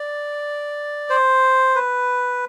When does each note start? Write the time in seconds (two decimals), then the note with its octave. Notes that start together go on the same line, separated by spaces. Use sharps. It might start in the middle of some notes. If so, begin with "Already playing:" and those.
Already playing: D5
1.10 C5
1.75 B4